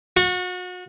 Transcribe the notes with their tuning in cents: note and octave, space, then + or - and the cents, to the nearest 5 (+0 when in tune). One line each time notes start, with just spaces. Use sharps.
F#4 -35 C#6 -10